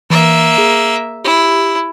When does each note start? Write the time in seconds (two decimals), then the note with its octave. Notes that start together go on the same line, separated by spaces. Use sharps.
0.10 E3 A#3 E5
0.58 G#4
1.25 E4 G4